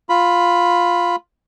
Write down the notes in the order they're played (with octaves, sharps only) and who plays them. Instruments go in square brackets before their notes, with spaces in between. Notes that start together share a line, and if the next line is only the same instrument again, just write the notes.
[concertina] F4 B5